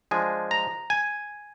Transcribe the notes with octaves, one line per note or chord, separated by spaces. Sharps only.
F3 G#3 D4 G#5
A#5
G#5